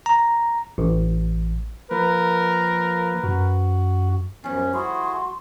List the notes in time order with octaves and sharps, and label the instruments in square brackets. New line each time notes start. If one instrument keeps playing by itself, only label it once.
[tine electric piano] A#5
A1
[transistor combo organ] F3 A#3 [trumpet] A#4 [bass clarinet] B4
[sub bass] F#2 [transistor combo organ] F#4
[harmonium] F#2 [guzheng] F3 G3 [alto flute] B3 [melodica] C#4
[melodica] A3 E4 G#4 [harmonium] F#4 [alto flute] C6